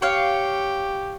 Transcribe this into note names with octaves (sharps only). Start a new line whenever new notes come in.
G4 C#5 F5